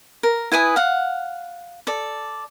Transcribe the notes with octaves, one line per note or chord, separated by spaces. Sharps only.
A#4
E4 B4 G#5 D#6
F5 F#5
A4 D5